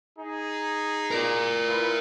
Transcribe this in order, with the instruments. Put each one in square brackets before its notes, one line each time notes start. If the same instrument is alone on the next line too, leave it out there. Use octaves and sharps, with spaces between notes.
[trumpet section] D#4 G#4
[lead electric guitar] A#4 D5
[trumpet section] E4 F4 B4